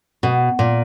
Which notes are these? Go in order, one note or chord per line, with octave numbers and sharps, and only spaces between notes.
B2
A#2